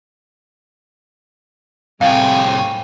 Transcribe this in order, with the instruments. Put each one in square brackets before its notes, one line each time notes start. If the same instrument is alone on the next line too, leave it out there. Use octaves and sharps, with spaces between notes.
[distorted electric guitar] C2 A2 [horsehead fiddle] C4 [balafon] F5 [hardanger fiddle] G5 G#5